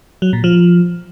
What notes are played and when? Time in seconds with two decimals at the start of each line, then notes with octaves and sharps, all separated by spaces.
0.22 F#3
0.33 A#2
0.44 F3